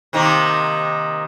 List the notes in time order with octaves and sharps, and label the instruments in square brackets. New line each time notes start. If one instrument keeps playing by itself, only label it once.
[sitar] C3 D#3 A#3